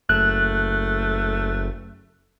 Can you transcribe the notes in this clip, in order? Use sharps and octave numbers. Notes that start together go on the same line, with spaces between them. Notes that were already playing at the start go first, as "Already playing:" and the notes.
F#1 A3 F#6